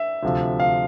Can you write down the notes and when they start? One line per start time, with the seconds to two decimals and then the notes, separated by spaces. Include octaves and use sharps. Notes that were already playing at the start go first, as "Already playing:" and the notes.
Already playing: E5
0.23 D2 C3 F3
0.60 F5